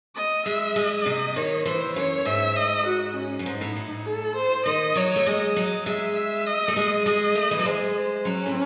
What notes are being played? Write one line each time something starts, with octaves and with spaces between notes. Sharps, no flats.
D#5
G#3 E5
G#3 D#5
C3
D#3 C#5
E3 C5
F#2 C#5
G#2 E5
D#5
F#4
C#4
F#2
G#2 D#4
A2
A2
A4
C5
D#3 D#5
F#3 C#5
A3
G#3 D#5
F#3 D#5
G#3 E5
E5
D#5
A3
G#3 D#5
G#3 D#5
A3
E3
F#3
G#3 C5
C5
F#3 C#4
A2